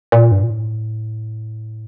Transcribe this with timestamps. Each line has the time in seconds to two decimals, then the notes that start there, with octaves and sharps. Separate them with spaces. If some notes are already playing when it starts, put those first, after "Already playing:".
0.12 A#2
0.32 G2
0.43 A#2
0.50 A2